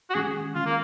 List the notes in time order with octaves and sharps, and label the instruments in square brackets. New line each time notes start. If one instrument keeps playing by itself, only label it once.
[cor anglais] F#4
[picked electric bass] D#3 G#3 C#4 [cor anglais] G#4
[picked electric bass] D#3 G#3 C#4 [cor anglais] F4
[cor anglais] A#3